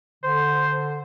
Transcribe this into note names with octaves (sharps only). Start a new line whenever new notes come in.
D3 C5